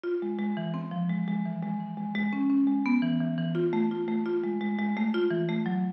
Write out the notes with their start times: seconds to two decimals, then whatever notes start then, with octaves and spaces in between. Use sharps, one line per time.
0.04 F4
0.22 G#3
0.39 G#3
0.57 E3
0.74 C4
0.91 F3
1.10 G#3
1.28 G#3
1.45 E3
1.62 G#3
1.80 E3
1.97 G#3
2.15 G#3
2.33 C#4
2.50 C#4
2.67 G#3
2.86 B3
3.02 E3
3.20 E3
3.38 E3
3.55 F4
3.73 A3
3.91 F4
4.08 A3
4.26 F4
4.44 G#3
4.61 G#3
4.79 G#3
4.97 A3
5.14 F4
5.31 E3
5.49 A3
5.66 F#3